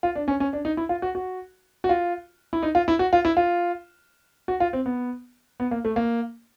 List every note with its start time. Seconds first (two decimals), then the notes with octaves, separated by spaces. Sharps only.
0.03 F4
0.15 D4
0.28 C#4
0.40 C#4
0.53 D4
0.65 D#4
0.77 E4
0.89 F4
1.02 F#4
1.15 F#4
1.84 F#4
1.89 F4
2.53 E4
2.63 D#4
2.75 F4
2.88 E4
2.99 F#4
3.13 F4
3.25 E4
3.37 F4
4.48 F#4
4.60 F4
4.73 C4
4.86 B3
5.60 B3
5.71 A#3
5.85 A3
5.96 A#3